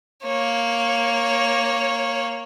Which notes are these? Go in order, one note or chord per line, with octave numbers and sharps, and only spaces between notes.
A#3 C#5